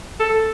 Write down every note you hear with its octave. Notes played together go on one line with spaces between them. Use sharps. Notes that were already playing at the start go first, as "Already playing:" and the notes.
A4